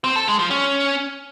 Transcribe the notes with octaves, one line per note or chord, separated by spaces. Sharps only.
C4
A4
G#3
F3
C#4